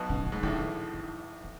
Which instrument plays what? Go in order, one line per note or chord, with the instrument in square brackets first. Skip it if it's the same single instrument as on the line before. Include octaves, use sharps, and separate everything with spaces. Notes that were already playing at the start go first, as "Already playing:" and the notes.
Already playing: [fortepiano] B1 B2
[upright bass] C#3
C#3
[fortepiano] G#2
[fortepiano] A1 A2 [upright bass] D3
[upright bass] D#3
D#3